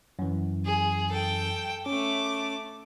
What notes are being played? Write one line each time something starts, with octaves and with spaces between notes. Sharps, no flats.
F#2 E3
G#4
A4 G5
A3 C#4 D6